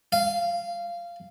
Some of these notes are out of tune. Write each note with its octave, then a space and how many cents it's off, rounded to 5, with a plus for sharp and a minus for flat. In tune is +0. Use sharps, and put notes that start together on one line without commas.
F5 -15